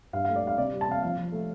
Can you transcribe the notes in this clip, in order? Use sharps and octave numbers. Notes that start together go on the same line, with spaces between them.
G2 F5
F5
A3
D5
G2 F5
C3 D5
G3
A5
C3 F5
F3 F5
F3
A3